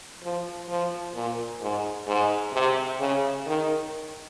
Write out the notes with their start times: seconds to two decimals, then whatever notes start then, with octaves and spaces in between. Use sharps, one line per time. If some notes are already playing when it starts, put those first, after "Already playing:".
0.23 F3
0.69 F3
1.15 A#2
1.62 G#2
2.07 G#2
2.53 C3
3.00 C#3
3.46 D#3